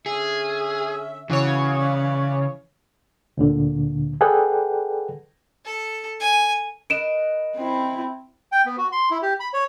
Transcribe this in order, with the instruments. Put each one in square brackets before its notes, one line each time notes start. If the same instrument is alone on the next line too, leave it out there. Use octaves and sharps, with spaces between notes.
[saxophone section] D3 C#4 E5 [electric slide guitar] G#4
[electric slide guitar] C#3 [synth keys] E3 C#5 [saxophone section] F#4
[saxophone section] C#4 B4 D5
[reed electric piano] D2 A#2 D3
G#4 A4 B4 D5 F#5 G5
[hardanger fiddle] A4
G#5
[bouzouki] A#4 B4 D#5 [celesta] D7 E7
[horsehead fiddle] C4 E4
[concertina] G5
B3
F#4
C6
E4
G4
B5
C#5